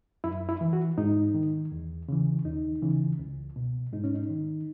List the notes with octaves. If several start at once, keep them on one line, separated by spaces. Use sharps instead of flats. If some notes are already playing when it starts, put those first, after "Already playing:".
F#2 E4
E4
E3
F#4
G#2 D#4
D#3
E2
C#3 E3
D#2 D#4
C#3 E3
C#2
B2
G#2 D#4
C#4
D#4
D#3